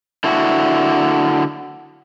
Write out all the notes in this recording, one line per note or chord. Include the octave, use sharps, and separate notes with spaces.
D3 E4 F#4